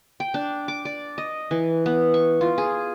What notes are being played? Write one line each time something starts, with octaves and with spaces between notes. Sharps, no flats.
G5
D4
D6
D5
D#5
E3
B3
C#6
F4
G#4